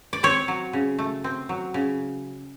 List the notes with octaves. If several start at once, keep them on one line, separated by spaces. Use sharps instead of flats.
D5
C4 C#5
F#3
C#3
A3
C4
F#3
C#3